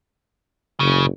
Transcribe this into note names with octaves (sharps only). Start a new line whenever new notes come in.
F#1 C#3